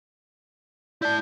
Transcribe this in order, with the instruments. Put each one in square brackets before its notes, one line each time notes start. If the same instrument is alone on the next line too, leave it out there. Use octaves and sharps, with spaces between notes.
[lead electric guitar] E4 A5 [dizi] D5 [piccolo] G6